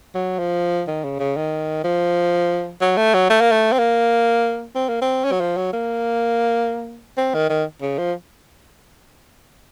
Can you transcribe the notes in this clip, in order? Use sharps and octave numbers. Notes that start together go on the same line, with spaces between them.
F#3
F3
D#3
C#3
C#3
D#3
F3
F#3
A3
F#3
A3
A#3
A3
C4
A#3
C4
A#3
C4
C#4
F#3
F3
F#3
A#3
C4
D#3
D#3
C#3
F3